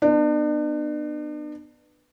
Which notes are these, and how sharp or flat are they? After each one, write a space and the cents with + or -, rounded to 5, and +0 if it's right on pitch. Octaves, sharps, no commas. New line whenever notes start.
B3 +0 D4 +40